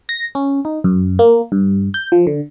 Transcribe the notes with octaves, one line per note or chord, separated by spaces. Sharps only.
A#6
C#4
D#4
F#2
A#3
G2
G6
F3
D3